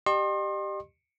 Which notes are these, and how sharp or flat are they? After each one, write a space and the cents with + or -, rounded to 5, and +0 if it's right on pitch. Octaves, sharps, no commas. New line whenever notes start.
G4 +0 D#5 -45 C6 +35